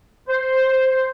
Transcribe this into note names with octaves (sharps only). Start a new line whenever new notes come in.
C5